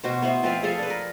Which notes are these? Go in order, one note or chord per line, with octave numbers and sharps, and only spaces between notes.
B2 F#4 C5
B3 E4 C5
F3 C4 B4 F5
F3 G#4 A4 F5
D4 B4
A#4